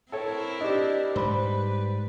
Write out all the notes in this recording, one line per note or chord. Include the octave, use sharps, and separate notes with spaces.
C4 E4 A4 A#4 C#5
D4 G4 D#5
G#2 G3 B4 C5 B5